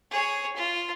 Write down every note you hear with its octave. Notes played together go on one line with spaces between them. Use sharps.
G#4 C#5
F4